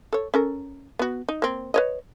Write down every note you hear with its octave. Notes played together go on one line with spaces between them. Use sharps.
A4 C#5
C#4 A4 A#4
B3 F#4
D#4
A#3 C4
B4 C#5 D#5